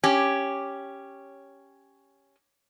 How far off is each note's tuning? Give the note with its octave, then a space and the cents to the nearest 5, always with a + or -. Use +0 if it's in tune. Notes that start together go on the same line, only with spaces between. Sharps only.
C#4 +0 G4 +0